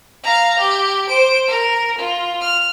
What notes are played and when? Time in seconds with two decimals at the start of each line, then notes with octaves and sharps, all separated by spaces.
0.23 F5 A#5
0.59 G4
1.09 C5 D7
1.48 A#4
1.98 F4
2.41 F6